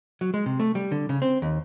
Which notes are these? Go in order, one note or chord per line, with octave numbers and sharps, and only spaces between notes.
F#3
G#3
C3
A3
G3
D3
C#3
C4
D#2